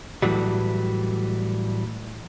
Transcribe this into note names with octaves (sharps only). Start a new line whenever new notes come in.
A2 E3 F#3 G3